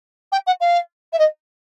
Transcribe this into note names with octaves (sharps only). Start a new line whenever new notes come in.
G5
F#5
F5
E5
D#5